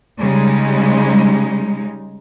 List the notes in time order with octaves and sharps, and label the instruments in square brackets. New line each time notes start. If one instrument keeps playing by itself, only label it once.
[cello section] C#3 G3 G#3 D#4